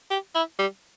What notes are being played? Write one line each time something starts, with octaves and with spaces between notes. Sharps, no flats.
G4
E4
G3